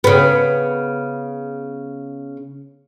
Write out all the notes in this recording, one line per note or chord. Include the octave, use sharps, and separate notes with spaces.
C#3 B3